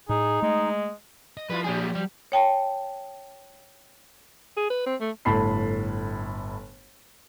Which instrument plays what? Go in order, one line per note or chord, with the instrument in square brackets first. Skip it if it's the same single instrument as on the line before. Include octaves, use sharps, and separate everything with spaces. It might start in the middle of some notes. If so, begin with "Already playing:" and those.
[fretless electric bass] A2 [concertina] D#4 [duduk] G#4
[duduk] G#3 [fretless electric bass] A3
[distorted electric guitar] D#5
[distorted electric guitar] F3 [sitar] G3 E4 F4 [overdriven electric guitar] B4
[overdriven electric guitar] A#2 G#4 [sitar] F#3 G4
[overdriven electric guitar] G3
[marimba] C#5 G5 A5
[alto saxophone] G#4
B4
C4
A3
[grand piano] G1 A2 A5 B5 C7